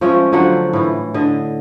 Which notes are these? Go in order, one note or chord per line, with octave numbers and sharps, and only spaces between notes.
F3 G#3 A3 C#4
D3 F3 F#3 F#5
A2 E3
D3 D#5